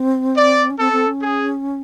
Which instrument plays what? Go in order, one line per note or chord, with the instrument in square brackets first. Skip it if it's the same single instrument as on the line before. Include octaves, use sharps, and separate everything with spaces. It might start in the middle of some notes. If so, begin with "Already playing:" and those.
Already playing: [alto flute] C4
[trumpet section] D5
[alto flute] C#4
[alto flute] C4 [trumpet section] A4
[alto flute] C4
C#4
[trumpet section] G#4